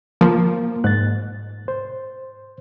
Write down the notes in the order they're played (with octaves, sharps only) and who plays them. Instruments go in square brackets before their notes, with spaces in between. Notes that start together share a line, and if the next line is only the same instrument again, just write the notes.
[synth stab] F3 [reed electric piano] A#3
[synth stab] G#2 [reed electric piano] F#6 A6
[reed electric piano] C5